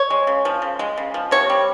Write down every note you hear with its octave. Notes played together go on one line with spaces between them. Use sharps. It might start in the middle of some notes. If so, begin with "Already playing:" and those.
Already playing: C#5
G#3
C#3
F3
C#3
G#3
C#3
F3
C3 C#5
G3